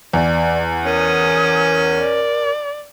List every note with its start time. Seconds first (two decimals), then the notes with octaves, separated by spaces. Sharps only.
0.13 E2 D5
0.85 C#4 A#4 D#6
1.99 D5